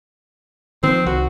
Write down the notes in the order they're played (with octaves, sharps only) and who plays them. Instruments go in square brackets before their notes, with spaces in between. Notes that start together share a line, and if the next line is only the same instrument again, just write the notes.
[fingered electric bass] D#3 F3 [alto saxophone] C4
[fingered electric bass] C2 D#3 [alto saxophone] F#4